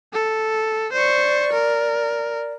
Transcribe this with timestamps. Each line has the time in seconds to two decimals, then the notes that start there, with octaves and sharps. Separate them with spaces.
0.13 A4
0.93 C5 D5 C#6
1.53 A#4